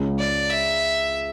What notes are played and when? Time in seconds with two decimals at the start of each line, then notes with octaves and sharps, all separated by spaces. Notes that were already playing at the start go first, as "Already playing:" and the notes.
Already playing: C#2 C#3
0.18 D5
0.50 E5